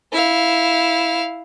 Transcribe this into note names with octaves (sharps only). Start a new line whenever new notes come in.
E4 F5